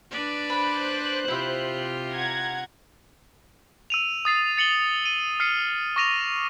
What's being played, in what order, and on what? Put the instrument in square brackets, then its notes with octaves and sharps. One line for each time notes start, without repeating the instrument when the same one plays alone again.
[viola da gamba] D4 B4 D5
[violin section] C5 F#6 [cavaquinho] B5
[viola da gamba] C3 F4 G4 [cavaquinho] E4 E5
[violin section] F#5 A#5 G#6
[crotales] E6 D#7 F7
D#6 A6 C7
A6 C#7 F#7 G7
D#7
F6 C7 C#7 D#7
C#6 D6 A#6 D#7 F7